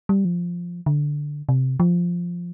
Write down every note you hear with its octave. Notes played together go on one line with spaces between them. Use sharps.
G3
F3
D3
C3
F3